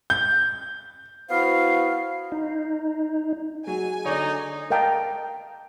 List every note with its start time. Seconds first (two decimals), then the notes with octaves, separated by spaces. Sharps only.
0.10 G6
1.30 B3 E4 F#4 C5 F5
2.32 D#4
3.67 F#3 G#4 G#5
4.06 D3 D#4 C#5 D5
4.70 A#4 D#5 F5 G5 A5 A#5